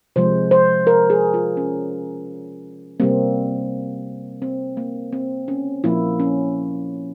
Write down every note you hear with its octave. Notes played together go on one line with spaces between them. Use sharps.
C3 F3 G#3 C5
C5
A#4
G#4
F4
C#4
C3 G3 A#3 C4
C4
A#3
C4
C#4
A#2 F3 A#3 E4
C#4